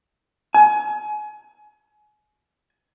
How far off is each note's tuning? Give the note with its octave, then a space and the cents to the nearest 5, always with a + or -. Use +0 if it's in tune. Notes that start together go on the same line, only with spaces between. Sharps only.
G#5 +30